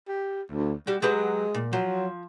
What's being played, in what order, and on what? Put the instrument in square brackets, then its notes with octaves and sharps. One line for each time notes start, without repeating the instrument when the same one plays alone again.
[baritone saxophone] G4
D2
[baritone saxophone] G3 [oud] F#4 G4
[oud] F#3 G4 B4 [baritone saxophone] G#3
[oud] A#2
[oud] F3 [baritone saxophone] F#3